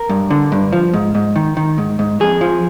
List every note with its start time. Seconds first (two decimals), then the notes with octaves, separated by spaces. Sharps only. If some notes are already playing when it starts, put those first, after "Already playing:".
Already playing: A#4
0.09 G2
0.30 D3
0.52 G2
0.72 F3
0.93 G#2
1.15 G#2
1.36 D#3
1.57 D#3
1.78 G#2
1.99 G#2
2.20 F2 G#4
2.41 F3